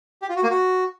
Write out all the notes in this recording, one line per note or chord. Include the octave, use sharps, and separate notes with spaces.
G4
F4
F#4
A#3
F#4